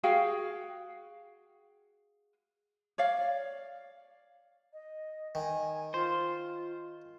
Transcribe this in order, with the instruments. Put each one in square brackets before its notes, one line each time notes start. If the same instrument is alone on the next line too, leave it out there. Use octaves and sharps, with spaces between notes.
[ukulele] F#4 G#4 F5 G5
C#5 D5 F5
[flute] D#5
[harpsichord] D#3 [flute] G#5
[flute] F4 [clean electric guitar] C5